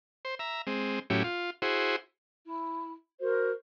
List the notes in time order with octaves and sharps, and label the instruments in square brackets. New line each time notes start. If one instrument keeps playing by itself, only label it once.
[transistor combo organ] C5
E5 A#5
G#3 C4
A2 F#3 C#4 E4 G4
F4
E4 F#4 G#4 C5
[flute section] E4
F#4 A#4 C5